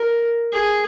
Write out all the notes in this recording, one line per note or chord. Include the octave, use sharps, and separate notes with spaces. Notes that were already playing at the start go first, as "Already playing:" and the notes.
Already playing: A#4
G#4